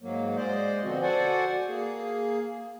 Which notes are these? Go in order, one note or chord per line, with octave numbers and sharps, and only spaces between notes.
G#2 F#3 A#3
G#3 C5 D5 D#5
B2 D3 F3 C4 F#4
F#4 A4 C5 D5 F#5 G#5
A#3 G#4